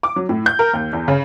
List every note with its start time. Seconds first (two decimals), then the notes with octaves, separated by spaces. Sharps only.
0.03 D6
0.16 F#3
0.29 A2
0.46 G6
0.59 A#4
0.73 D#2
0.93 E2
1.08 C#3